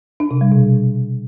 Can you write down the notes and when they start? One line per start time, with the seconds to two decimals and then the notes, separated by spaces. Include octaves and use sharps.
0.20 D4
0.31 C3
0.41 G3
0.52 B2